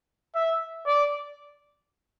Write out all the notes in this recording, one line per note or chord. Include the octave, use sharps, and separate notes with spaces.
E5
D5